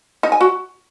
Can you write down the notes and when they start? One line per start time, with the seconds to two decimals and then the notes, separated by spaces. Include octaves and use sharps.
0.23 D#4
0.32 G#5
0.41 F#4